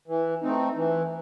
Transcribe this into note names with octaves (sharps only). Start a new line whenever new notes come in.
E3
A3 C4 D#4
E3